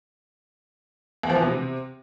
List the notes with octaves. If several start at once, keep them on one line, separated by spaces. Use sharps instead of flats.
E2
F3
E3
B2
C3